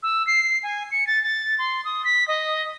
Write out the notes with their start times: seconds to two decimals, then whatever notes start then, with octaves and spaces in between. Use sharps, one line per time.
0.03 E6
0.27 C7
0.63 G#5
0.91 C#7
1.07 A6
1.23 A6
1.59 C6
1.85 D#6
2.05 B6
2.28 D#5